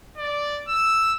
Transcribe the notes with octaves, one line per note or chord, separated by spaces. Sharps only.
D5
E6